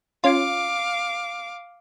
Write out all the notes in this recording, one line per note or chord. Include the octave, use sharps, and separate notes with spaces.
C#4 F4 F5 D6